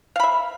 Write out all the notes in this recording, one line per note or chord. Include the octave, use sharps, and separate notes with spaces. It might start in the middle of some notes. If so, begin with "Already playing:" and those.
E5 F5 B5